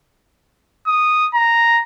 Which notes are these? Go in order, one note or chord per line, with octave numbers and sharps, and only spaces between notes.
D#6
A#5